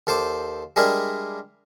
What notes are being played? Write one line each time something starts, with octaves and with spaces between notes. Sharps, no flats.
D#2 A4 C5 D6
G3 G#3 D4 E4 G#4 A#4